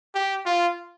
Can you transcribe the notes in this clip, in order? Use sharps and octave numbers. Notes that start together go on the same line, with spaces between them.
G4
F4